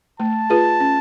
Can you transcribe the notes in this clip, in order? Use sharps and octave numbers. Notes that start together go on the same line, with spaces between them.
A3 A5
F4 G#4 B4
C#4